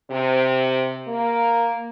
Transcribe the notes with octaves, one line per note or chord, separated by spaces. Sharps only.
C3
A#3